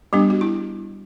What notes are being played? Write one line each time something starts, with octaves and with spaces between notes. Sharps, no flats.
G3 B3 D4 G4
F#4
E4